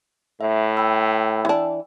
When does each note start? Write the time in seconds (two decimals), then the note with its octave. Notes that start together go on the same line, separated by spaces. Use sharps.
0.41 A2 E5
0.77 G5 B5 E6
1.45 E3 D4